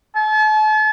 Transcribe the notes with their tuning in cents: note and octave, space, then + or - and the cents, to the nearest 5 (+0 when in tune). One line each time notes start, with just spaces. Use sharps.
A5 -40